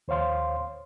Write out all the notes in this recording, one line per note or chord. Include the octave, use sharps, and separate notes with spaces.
D#2 C5 C#5 F5 C6